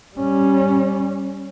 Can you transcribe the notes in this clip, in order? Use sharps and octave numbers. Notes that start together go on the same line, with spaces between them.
G3 C#4